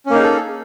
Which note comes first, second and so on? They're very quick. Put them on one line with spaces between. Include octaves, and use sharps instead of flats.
C#4 A#3 D#4 G#4 A4